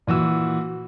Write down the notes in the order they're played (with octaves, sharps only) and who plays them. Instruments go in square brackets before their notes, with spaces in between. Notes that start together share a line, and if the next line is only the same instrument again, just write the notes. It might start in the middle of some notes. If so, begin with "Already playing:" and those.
[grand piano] A#2 E3 F#4 E6